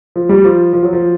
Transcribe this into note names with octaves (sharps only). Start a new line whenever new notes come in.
F3
G3
F3
F3
F#3
F3